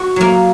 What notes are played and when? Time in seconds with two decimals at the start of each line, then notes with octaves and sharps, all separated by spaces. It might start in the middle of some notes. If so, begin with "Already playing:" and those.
Already playing: F#4
0.16 F#3 A#3